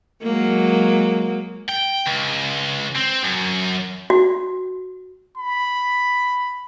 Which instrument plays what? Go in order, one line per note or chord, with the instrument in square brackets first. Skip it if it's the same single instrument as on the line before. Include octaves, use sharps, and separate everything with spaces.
[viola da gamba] F#3 G#3 A#3
[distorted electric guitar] G5
C#2
C4
F#2
[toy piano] F#4
[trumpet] B5